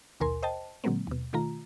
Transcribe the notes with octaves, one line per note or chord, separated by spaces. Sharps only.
A#1 D#2 B2 A#4 G#5 C6
C5 D#5 G5 A5
A#2 D3 F#3 G#3 A#3 C4
D#2 B2
B2 D#3 A3 F4 A#5